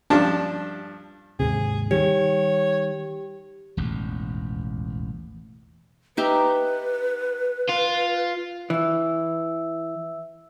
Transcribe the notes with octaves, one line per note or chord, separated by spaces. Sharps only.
G2 F3 D4 G4 A5
D#2 G#2 C3 G#4
D#3 G3 G4 C#5
E1 A1 D#2
D#4 G4 B4 E5
F4
E3 E5 E6